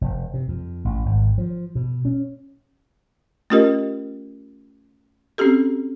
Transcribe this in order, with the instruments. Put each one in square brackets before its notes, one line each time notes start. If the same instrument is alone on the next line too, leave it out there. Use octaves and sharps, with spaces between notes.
[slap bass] F1
C3
F2
A1
G#1
F3
B2
C#4
[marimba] A3 C#4 F4 G4 A#4 D#5
C4 C#4 F#4 G4 A4